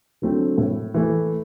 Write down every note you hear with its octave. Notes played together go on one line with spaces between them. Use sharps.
D3 F#3 A3 C4
A2
E3 A3